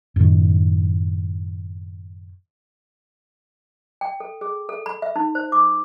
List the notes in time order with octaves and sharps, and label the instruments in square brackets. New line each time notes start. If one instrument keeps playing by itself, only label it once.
[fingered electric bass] F#2 A2 D#3
[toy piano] G5
A4
G#4
A4
B5
E5
D#4
C5
D6